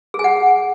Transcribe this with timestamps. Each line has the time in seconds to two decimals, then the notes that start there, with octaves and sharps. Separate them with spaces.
0.14 G#4
0.19 G#5
0.24 F#5